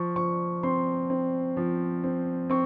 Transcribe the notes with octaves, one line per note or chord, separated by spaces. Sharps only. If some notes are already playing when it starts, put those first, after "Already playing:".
Already playing: F3 C#6
F3 C#6
C4 C6
C4
F3
C4
C4 C#6